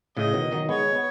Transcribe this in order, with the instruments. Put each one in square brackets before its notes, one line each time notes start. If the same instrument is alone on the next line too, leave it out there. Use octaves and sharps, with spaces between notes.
[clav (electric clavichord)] A2 C#3 [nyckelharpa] D#5
[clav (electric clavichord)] B2 D#3
D#3 F#3
[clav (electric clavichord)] G#3 B3 [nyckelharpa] C#5
[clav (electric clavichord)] B3